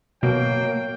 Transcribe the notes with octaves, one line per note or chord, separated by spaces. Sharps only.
B2 F#3 A#3 G5